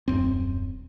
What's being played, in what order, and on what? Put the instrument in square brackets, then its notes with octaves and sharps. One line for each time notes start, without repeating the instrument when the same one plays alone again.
[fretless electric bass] D#1 F#2 C4